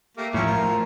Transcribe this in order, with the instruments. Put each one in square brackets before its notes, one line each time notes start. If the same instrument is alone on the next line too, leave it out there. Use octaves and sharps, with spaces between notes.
[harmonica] A3 A#3 G4
[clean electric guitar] A2 F3 [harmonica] C#4 E4 A#4
[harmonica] F4 A#4